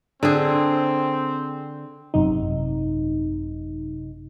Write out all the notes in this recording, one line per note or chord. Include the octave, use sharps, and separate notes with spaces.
D3 C4 G#4
G#1 F#2 C3 D#4